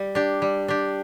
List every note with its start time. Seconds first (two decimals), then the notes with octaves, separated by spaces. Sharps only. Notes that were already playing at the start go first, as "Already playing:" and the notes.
Already playing: G3
0.15 D4 G4
0.42 G3
0.68 D4 G4